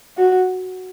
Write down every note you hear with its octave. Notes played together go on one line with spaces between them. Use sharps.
F#4